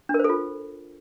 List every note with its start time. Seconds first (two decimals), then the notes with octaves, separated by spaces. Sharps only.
0.09 D4
0.14 A#4
0.19 C5
0.24 A4
0.29 F4